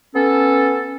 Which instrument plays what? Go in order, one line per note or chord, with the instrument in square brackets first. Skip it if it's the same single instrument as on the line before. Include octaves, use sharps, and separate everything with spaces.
[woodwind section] B3 C#4 A4